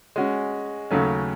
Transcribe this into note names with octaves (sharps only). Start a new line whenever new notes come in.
G#3 C#4 F#4
D#2 C#3 F#3 A3 C#4